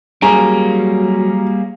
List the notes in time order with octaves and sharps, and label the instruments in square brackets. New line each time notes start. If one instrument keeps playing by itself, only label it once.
[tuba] F#3 [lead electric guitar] G3 A#3 [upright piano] C#4 G#4 [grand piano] A#5